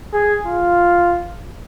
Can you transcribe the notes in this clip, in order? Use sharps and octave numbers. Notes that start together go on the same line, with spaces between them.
G#4
F4